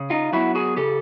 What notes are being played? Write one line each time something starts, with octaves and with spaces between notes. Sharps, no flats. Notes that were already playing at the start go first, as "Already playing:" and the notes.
Already playing: C#3
D#4 F4
F#3 B3 E4 F#4
F#4 G#4
C#3 G4 A4